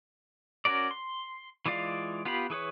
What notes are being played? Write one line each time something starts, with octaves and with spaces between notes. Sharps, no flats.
C#4 F#4 A#4 D5
C6
E3 G#3 F4 D5 F5
B3 F4 G4 F5 B5
E3 G#4 B4 C#5